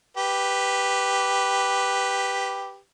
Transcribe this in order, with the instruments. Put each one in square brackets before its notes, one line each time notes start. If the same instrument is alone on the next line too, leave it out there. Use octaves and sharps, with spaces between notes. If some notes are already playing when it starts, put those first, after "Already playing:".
[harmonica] G4 B4